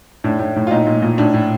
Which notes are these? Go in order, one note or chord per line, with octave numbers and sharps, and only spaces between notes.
A2 D4
A2
A2
F4
A#2 D#4
A#2
A#2
A2 D4
A2